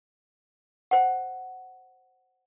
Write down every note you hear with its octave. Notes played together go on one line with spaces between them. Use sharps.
C5 F#5